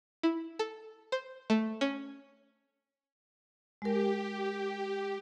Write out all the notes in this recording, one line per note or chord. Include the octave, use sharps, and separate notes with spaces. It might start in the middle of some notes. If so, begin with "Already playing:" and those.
E4
A4
C5
A3
C#4
G#3 G4 A#4